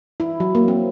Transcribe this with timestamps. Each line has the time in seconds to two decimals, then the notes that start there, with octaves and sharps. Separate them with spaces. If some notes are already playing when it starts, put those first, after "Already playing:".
0.20 E4
0.40 F#3
0.55 A#3
0.68 C4